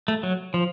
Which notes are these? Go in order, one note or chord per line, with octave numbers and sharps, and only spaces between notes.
A3
F#3
F3